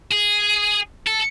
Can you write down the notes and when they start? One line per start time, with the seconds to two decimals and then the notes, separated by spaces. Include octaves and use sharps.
0.12 G#4
1.07 A4